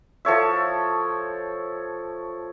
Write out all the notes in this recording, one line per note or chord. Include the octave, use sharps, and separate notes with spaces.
F3 A4 C#5 E5